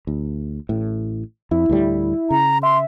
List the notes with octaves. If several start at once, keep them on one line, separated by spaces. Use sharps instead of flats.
D2
A1 A2
F2 E4
D2 A2 G3
C#3 A#5
E5 C6